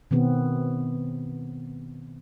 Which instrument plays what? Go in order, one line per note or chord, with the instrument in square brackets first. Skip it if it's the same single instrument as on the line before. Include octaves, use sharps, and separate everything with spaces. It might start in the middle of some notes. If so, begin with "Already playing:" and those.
[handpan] B2 D#3 B3 C4